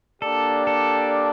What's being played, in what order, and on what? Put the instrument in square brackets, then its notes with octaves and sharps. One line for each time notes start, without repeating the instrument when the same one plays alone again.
[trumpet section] A#3 D4 G4 D5 [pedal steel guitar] A4
[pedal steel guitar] A4